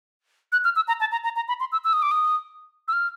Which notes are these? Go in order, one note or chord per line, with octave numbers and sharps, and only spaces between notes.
F#6
F6
E6
A#5
A5
A#5
A#5
A#5
B5
C6
E6
E6
D#6
D6
D#6
E6
F6